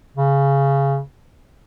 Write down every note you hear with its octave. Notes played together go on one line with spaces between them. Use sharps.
C#3